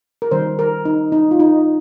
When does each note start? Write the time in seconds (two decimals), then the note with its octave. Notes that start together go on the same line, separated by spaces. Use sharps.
0.22 A#4
0.31 D#3 G3 C#4 C5
0.59 A#4
0.85 D#4
1.12 D#4
1.31 F4
1.39 D#4